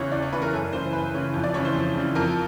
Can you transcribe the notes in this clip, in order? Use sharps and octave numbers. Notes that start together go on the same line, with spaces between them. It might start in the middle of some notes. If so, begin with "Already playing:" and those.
Already playing: E2 C#3 E3 C#5
E2 D5
C#5
C#3 E3 B4
A#4
F#2 A4
C#3 E3 C5
F#2 B4
C#3 E3 C#5
F2
D5
C#3 E3 C#5
C5
F2
C#3
E3
F2 A#4